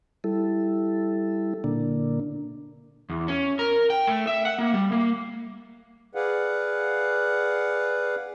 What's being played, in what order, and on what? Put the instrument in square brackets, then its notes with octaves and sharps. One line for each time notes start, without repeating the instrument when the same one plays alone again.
[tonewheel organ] G3 E4 A4
A#2 D3 A#3 D4
[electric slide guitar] E2
C#4
A#4
G5
A3
E5
F#5
A#3
G3
A#3
[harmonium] G#4 B4 D5 F5 F#5